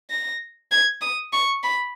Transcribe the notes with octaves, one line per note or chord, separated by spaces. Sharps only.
A#6
G#6
D#6
C#6
B5